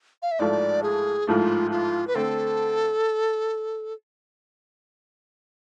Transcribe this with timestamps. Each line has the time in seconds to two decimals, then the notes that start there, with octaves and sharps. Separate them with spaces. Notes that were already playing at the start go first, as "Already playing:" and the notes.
0.22 F5
0.31 E5
0.39 A1 G#2 F3 A3 D5
0.83 G#4
1.27 A1 G#2 F3 A3 F4 G#4
1.71 F4
2.07 B4
2.15 D3 A3 C4 A4